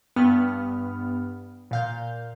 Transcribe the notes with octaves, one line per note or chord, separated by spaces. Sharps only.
G2 B3 F6
A#2 F5 G6